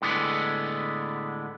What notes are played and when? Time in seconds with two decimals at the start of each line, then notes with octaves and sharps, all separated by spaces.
0.02 A2 D3 G#3 B3